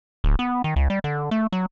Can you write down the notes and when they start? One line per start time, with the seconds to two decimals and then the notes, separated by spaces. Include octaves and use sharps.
0.24 D1
0.39 B3
0.64 D#3
0.76 C#2
0.90 G3
1.04 D3
1.31 A3
1.52 F#3